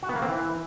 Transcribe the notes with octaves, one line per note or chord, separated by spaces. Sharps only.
F#4
B3
A#3
C4
E3